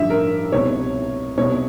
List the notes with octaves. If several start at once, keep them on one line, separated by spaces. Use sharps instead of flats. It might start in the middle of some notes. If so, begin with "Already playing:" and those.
Already playing: A1 G2 D3 F3 E5
A#4
C2 B2 C#5
C2 B2 C#5